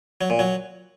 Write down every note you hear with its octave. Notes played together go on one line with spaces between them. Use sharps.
F#3
A#2
F#3